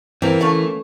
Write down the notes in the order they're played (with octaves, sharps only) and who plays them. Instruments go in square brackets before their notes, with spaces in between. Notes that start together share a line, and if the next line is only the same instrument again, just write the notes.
[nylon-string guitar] E3 A#3 [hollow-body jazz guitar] C4 A#4
[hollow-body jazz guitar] A3 C#4 F5